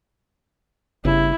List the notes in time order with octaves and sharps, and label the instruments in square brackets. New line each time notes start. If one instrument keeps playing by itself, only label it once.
[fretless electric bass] G1 G2 C#3 [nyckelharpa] E4